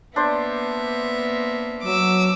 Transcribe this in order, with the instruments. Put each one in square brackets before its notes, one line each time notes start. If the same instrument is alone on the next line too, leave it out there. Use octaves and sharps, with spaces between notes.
[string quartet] A#3 B3 E5 [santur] D4 C5
[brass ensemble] F#3 [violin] D6 E6